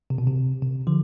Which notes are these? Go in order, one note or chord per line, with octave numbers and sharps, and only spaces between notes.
C3
B2
C3
C3
D3 F3